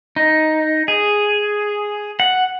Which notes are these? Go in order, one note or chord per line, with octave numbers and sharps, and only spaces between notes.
D#4
G#4
F#5